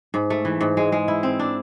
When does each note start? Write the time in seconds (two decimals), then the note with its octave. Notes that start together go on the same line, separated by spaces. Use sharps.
0.14 G#2
0.30 A3
0.45 E3
0.61 G#2
0.77 G#3
0.92 G#3
1.08 E4
1.23 C4
1.40 D4